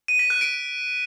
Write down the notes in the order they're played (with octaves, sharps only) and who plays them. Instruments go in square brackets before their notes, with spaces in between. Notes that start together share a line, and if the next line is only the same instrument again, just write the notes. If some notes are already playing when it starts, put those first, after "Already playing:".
[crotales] D#7
B6
F#6
D7